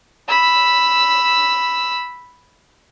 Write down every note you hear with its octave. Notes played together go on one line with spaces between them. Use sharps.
B5 E6